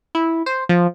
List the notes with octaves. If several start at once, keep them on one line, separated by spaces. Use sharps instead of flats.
E4
C5
F3